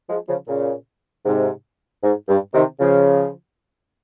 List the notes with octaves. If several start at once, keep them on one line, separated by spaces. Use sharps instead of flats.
F3 G#3
C#3 F3
A#2 C#3
G#2 C3
G#2
G2
C3 D#3
C#3 F3